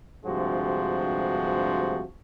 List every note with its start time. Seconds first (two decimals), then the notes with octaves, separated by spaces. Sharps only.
0.25 D2 G2 C3 F3 G#3 F#4